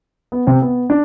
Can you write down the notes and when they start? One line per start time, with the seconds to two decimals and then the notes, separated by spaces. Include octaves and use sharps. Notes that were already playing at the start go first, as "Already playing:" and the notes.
0.32 B3
0.47 C3 C4
0.62 B3
0.90 D4